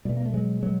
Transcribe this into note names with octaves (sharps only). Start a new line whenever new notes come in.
B2 G3 A3
A#3
A3
F#3 G#3
F#3 G#3